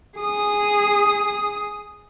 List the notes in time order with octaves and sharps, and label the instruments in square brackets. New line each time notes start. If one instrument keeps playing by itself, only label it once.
[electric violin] G#4 D#6